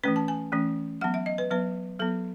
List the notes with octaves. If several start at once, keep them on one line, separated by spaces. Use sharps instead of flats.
E3 A3 C#4 B4
A5
G#5
E3 A3 C#4
F#3 B3 F#5
E5
D#5
B4
F#3 B3 B4
F#3 B3 A4